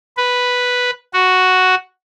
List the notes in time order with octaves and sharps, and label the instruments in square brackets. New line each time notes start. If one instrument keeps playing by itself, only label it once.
[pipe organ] B4
F#4